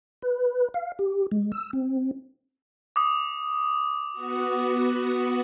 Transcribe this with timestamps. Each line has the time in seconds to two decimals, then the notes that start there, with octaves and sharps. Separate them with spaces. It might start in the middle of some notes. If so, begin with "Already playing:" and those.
0.22 B4
0.74 F5
0.99 G4
1.31 G#3
1.52 E6
1.73 C4
2.96 D6 D#6
4.13 B3 F#4